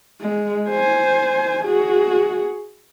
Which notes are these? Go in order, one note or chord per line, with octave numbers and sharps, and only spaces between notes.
G#3
C5 G#5
F#4 G#4